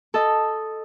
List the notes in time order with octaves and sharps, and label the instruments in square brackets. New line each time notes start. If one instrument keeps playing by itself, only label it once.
[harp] A4 D#5